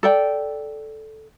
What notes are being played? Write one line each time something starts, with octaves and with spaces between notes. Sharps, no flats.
A4 D5 G5